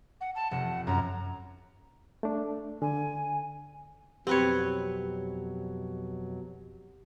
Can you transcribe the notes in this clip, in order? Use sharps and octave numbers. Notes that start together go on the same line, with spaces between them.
F#5
A5
F1 F#5
F#2 A#5
A3 D4
D3 G#5
F2 B2 F#3 C4 G4 B4 C#5